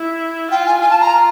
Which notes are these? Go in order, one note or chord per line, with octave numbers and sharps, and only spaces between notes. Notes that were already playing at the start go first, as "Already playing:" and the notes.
Already playing: E4
F4 G5
G#5
F4 G#5
A5
A#5